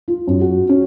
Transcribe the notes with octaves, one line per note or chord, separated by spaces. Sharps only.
F4
F#2
F#4
C#4